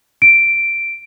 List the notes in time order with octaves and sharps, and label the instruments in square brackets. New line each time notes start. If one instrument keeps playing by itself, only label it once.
[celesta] D7